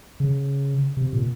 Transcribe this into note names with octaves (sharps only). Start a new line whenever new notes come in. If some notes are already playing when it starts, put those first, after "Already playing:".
C#3
C3
A#2